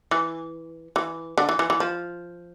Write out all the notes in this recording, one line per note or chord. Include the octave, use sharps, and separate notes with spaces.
E3
E3
D3
E3
E3
E3
F3